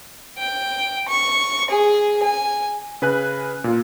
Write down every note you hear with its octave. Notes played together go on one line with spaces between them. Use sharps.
G5
C#6
G#4
G#5
C#3 B4 G#5 F#6
A#2 F4